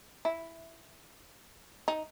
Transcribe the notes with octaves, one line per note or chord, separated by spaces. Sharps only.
E4
D#4